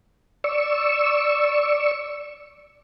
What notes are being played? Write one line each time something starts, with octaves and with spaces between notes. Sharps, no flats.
D5 C#6 E6